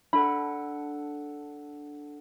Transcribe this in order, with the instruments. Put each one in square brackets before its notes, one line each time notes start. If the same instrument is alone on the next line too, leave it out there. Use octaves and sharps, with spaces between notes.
[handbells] D4 A4 F#5 [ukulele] B5